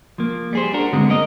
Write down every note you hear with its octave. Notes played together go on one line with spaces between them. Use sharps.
F3 A#3
G3 G#4 C5
D4 F#4 A#4
G2 D3 G#3 B3 C4
A#3 A#4 D#5